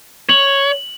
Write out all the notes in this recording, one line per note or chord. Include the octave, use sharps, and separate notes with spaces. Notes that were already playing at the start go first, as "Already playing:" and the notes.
C#5 F#7